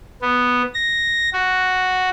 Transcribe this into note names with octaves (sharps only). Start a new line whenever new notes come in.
B3
A#6
F#4